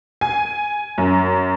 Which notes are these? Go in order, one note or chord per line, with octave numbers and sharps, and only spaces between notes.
G#5
F#2